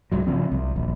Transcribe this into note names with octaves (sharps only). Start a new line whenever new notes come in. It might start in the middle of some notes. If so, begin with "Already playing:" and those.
C2 G#2 F#3
C#3 F3 C4
C2
D#1 A#1